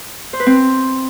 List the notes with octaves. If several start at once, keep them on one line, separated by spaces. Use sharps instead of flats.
C5
B4
C4